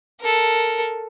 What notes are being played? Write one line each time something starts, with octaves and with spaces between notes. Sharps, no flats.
A4 A#4